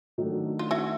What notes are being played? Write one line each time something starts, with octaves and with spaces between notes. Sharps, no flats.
D#3 F#3 A3 D4
F4
E4 F#4